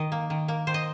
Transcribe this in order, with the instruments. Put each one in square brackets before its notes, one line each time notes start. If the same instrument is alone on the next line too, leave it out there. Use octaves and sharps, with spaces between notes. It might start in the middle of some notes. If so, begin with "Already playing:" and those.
Already playing: [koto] D#3 D#5
A#3
D#3
A#3
D#3 C5
D#5